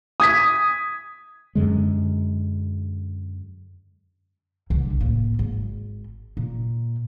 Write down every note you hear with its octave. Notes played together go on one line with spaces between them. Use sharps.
D#6 G#6 B6
F#2 D3 G#3
C2 D3
A2 A#3
G#1
A#2